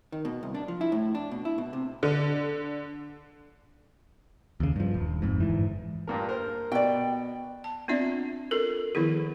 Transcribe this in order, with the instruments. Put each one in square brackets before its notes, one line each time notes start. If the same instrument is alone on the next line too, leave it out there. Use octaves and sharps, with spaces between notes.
[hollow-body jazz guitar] D#3
B2
C2
D4
F3
E4
A2
D4
B2
E4
B2
C3
[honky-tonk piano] D3
[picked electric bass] D#2 C#3
G2 F3
D#1
A#1 F2 G#2
G1 G#2 E3
[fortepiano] G2 A#2 A#4
A#4 C5
[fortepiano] B2 [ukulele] D5 G5
[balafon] A5
B3 C4 D4 F4 D5 E5
F4 A4 A#4
D#3 F3 B3 E4 G#4